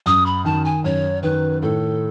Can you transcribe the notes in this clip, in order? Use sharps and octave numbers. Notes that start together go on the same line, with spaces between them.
F#2 D#6
B5
D#3 A5
G#5
F#2 C#5
D#3 B4
A2 A4